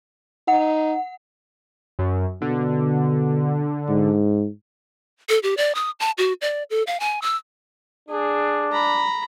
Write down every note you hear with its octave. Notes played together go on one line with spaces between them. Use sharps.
D#4 F#5
F#2
B2 D3
G#2
A4
G4
D5
D#6
A5
F#4
D5
A4
F5
G#5
E6
D4 G#4
A#5 B5